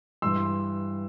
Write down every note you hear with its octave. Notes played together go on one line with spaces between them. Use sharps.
G2 E3 C6 E6